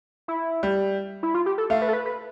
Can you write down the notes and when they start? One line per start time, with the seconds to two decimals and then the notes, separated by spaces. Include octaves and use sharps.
0.28 E4
0.63 G3
1.23 E4
1.34 F4
1.46 G4
1.58 A4
1.70 A3 F5
1.82 B4
1.88 A4
1.93 B4
2.06 B4